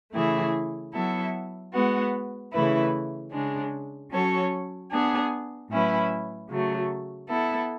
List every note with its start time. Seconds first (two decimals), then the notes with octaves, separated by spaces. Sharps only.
0.13 C#3 E3 A3 E4 G#4
0.93 F#3 B3 E4 A4 E5
1.72 G#3 B3 F#4
2.52 C#3 E3 A3 E4 B4
3.31 C#3 G#3 D4
4.10 F#3 C#4 F#4 A4 C#5
4.90 B3 D4 G#4
5.69 A2 F#3 C#4 E4 B4
6.49 C#3 F#3 A3
7.28 B3 E4 A4